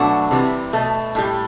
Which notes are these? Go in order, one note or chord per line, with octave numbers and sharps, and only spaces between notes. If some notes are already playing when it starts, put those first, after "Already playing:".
Already playing: B2 F#3 A3 D4 F#4
C3 E3 G3
B2 A3
A2 G3